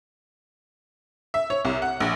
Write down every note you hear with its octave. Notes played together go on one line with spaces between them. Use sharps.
E5
C#5
C2
F#5
A#1